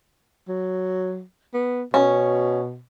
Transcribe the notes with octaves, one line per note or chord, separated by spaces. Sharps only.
F#3
B3
B2 C#4